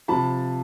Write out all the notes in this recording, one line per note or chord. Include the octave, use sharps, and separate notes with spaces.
C3 F3 A5 B5